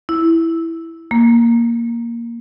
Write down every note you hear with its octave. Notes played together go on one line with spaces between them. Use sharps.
E4
A#3